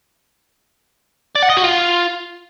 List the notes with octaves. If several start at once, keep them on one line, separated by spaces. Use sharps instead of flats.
D5
F#5
D#5
F#4
F4